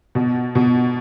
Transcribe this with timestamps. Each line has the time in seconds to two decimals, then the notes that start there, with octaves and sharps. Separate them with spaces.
0.15 B2
0.55 B2